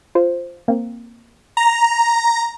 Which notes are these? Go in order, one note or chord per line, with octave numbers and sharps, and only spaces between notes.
F4 C5
A#3 C4
A#5